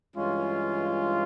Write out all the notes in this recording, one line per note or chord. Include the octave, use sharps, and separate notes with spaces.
G2 E3 G#3 C#4 F4